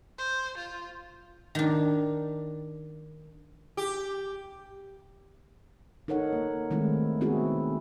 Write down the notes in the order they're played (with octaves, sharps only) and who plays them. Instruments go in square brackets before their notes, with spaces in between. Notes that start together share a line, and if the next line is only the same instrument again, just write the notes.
[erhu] C5
F4
[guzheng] D#3 D4
[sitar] G4
[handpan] D#4 A4 A#4 C#5 F#5
A#3
D#3 G#3 A3 C4 E4
B3 C4 E4 F#4 G#4